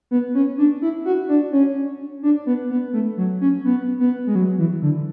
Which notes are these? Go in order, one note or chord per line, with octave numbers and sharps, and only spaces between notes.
B3
C#4
D4
E4
F#4
D4
C#4
D4
B3
B3
A3
F#3
C#4
B3
B3
G#3
F#3
E3
D3